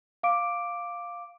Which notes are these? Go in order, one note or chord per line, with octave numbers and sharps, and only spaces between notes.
F5 D6 D7